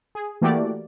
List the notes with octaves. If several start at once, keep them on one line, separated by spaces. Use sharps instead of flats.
G#4
E3 A3 A#3 F#4 G4 D5